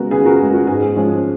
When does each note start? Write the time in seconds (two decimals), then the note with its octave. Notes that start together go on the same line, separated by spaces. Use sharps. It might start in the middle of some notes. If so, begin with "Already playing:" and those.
Already playing: C#3 G#3 B3 F#4 A#4
0.11 C#3 G#4 B4
0.26 F#4 A#4
0.39 G#3 B3 G#4
0.54 F#4
0.67 G#2 G#4
0.96 F3 G#3 C#4